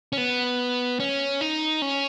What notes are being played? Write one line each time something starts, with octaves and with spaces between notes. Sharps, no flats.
C#4
B3
C#4
D#4
C#4